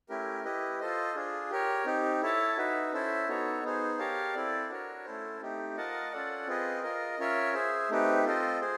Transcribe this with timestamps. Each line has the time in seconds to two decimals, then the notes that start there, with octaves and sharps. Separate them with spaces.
0.09 A3 C#4 E4 G4 A#4
0.44 E4 G4 B4 D#5
0.80 F4 A4 C5 D#5
1.15 D4 F4 G#4
1.51 G4 A#4 C#5
1.86 C4 D#4 G4
2.22 E4 A4 C#5 E5 A5
2.57 D#4 F#4 B4 E5
2.93 C#4 E4 A4 C5 E5
3.28 B3 D#4 F#4 A4 C#5
3.63 B3 D#4 G#4 C5
3.99 G4 A#4 C#5 F5 A5
4.34 C4 E4 A4 D5
4.69 D4 F#4 A#4 C#5
5.05 A3 C#4 E4 A4 C5
5.41 A3 C4 D#4 G4
5.77 F4 A#4 D#5 F#5 A5
6.12 C#4 F4 A4 D5 F#5
6.47 C4 F4 G#4 B4 D#5
6.83 F4 A#4 D#5
7.19 C#4 F4 A#4 C#5 E5
7.54 G#4 C5 E5
7.90 A3 C4 D#4 G4 B4
8.24 C4 F4 A4 C5 D#5
8.61 G#4 C5